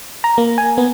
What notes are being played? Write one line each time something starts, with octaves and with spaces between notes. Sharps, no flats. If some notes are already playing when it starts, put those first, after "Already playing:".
A#5
A#3
G#5
B3